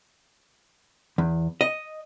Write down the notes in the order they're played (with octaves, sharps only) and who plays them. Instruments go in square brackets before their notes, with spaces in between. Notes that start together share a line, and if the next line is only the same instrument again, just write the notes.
[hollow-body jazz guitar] E2
D#5